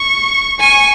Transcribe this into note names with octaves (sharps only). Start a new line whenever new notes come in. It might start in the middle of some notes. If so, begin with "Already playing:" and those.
Already playing: C#6
G#5 C#6